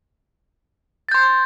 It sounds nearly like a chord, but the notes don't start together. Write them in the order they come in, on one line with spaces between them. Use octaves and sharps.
A6 G6 C6